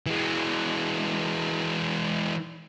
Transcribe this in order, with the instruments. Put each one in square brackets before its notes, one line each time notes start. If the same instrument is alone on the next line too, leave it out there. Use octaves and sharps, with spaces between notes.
[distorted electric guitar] E3 G#3